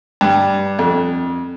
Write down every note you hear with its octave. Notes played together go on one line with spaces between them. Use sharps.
G2
F2